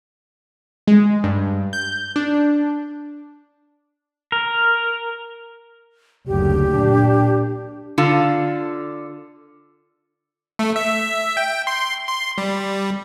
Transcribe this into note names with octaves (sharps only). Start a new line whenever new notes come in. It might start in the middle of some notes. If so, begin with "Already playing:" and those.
G#3
G2
G6
D4
A#4
F#1 D2 G4
A#2 D4
D3 F4 A4
A3
E5
G5
C6
C6
G3